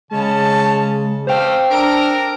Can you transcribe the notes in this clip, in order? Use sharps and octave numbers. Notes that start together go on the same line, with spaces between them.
C#3 G#3 C#4 A5
G3 A3 C5 F5 G5
D4 A4 A#4 D7